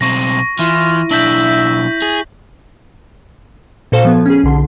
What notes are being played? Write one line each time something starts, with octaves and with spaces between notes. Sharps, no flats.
B1 C4 C#6 A#6
E3 E4 F4
B1 D4 E5 G6 B6 F#7
G#4
A#2 F#4 A4 C5 F5
F3 B3 G#6
C#4 G#4
B1 D3 C6